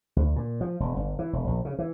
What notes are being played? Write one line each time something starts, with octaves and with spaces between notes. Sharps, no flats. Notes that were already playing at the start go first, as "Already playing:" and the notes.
D2
A#2
F3
E1
G1
E3
E1
A#1
C#3
E3